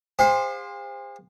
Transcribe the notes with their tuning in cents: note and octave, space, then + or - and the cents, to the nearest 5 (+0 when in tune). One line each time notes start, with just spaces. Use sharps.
G#4 -45 C5 +0 F5 +35